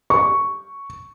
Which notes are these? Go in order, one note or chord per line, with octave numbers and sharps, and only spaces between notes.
C#6